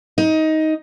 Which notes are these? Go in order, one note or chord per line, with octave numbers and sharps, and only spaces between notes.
D#4